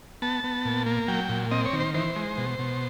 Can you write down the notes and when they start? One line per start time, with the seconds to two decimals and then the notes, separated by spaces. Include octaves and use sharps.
0.22 B3 A5
0.44 B3
0.65 A#2
0.86 A#3
1.08 F#3 G5
1.29 A#2
1.51 C4 D#5
1.65 C#5
1.73 D#3
1.80 C5
1.94 E3 C5
2.16 G#3
2.38 B2
2.59 B2